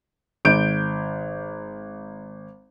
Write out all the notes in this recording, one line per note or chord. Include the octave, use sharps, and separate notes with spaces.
G#1 G6 D7